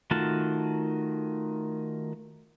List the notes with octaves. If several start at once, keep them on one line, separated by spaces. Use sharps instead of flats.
D#3 A3 F4 F#4 A5